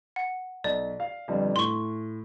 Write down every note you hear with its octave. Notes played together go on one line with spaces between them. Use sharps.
F#5
B1 D5
F5
G1 F2 G3
A2 C6 C#6